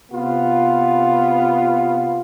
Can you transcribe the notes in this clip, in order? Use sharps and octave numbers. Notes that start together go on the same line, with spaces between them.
C3 B3 F4